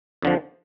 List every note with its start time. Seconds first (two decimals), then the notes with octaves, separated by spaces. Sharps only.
0.22 F2 D3 F3